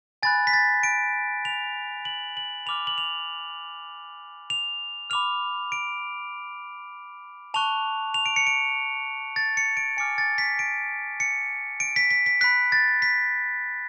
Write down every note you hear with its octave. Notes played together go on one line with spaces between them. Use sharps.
G#5 B5 F#6 A6
B6
A6
D7
F7
F#7
F#7
B5 D6 F6 F7
F#7
F7
F7
B5 D6 F6 F7
D7
A5 C#6 F#6 F7
F7
D7
C#7
D7
A6
C#7
D7
G#5 D6 F6 C#7
A6
B6
D7
C#7
D7
B6
B6
B6
B5 F#6 B6
A6
B6